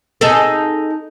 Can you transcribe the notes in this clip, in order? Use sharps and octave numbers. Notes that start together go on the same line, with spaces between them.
D#4 G#4 A4